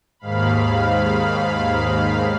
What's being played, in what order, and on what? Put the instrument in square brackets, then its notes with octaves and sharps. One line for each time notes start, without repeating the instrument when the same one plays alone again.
[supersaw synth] D#2 G#2 F5 B5